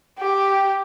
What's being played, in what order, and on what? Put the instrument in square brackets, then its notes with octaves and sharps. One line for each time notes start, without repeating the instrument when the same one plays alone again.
[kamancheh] G4 G5